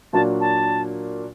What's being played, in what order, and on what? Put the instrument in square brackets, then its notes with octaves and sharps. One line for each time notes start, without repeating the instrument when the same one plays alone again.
[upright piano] A#2 F#3 A#3 D4 F#4 [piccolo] A5
[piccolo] A5